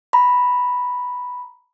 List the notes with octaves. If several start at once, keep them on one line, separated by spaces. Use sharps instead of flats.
A#5 B5